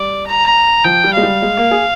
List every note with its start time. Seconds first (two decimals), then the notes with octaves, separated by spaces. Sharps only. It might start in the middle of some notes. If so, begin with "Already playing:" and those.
Already playing: G3 D5
0.27 A#5
0.84 F3 G5
1.04 G3
1.13 G#3 F5
1.23 G3
1.42 G#3
1.57 A#3
1.71 G#4